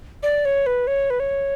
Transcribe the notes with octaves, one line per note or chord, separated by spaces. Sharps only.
D5
C#5
B4
C#5
B4
C#5